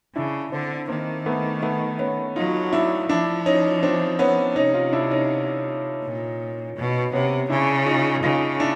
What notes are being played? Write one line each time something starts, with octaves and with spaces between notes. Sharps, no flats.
C#3 D4 E4
D3 C4 D4
D#3 A#3 C4
A3 B3
A3 B3
B3 C#4
F#3 D#4 F4
D4 E4
F3 D4 E4
C#4 D#4
C4 D4
B3 C#4
C3 C#4 D#4
D#4 F4
D4 E4
C#4 D#4
A#2
B2
C3 B3 C#4
C#3 D4 E4
D#4 F4
C#3 D#4 F4
D4 E4